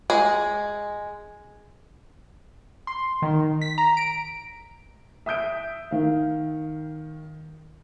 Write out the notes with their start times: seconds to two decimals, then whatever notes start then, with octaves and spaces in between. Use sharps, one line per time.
0.10 G#3
2.87 C6
3.22 D#3
3.61 B6
3.78 A#5
3.97 D7
5.26 E5 D#6 G6 D7
5.91 D#3 F5